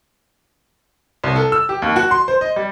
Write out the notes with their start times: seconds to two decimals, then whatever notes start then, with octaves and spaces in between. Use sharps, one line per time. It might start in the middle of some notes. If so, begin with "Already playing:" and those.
1.24 C2
1.36 A4
1.52 E6
1.69 G4
1.82 D#2
1.96 F#4
2.11 C6
2.28 C5
2.41 D#5
2.56 G3